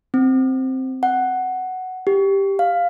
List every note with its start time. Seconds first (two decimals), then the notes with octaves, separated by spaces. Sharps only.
0.14 C4
1.03 F#5
2.07 G4
2.59 F5